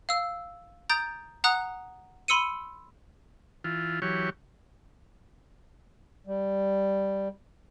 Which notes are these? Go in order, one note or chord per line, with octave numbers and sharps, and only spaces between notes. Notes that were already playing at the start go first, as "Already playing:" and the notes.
F5 E6
A#5 D#6 G6 A6 D7
F#5 A#5 D#6 F#6
B5 C6 E6 C#7 D#7
E3 F4
E3 F#3 G4 C#5
G3